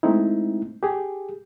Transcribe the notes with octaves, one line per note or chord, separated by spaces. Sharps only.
G#3 A3 C4 D#4 E4
G4 G#4